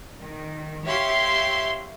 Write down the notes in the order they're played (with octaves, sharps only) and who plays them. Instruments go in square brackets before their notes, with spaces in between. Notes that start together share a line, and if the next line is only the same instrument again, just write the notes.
[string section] D#3
G4 C#5 E5 F5 C6